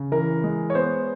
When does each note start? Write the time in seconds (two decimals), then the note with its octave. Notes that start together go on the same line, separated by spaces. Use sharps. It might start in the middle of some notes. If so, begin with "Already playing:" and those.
Already playing: C#3
0.12 E3 A#4
0.44 G#3
0.70 C#5
0.75 B3 C5